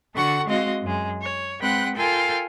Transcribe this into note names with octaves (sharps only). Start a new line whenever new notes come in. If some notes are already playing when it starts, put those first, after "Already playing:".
D3 F#4 A4 F#5 C#6
G#3 C4 F#4 D#5 F5
F#2 G#3
C#5
G#3 C4 B4 F#5 G5 F#6
F4 A4 A#4 F5 G5 G#5